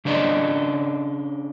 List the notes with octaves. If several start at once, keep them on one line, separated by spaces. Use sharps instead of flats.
C#3 D4 C5 D5 D#5